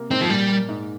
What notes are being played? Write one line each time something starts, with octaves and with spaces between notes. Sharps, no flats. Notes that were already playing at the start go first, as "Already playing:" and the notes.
Already playing: C3 A#3
G#2 C4
F3
A#2 G3
A#3
G#2